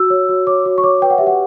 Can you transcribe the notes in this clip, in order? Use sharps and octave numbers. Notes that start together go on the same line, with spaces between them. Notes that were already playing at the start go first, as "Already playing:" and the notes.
Already playing: F#4 E6
C#5
F#4
C#5 D6
F#4
C#6
C#5 D6
B4 G5
F#5
G4 E5
F#5